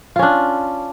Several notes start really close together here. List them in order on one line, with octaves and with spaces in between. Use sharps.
F4 C#4 D4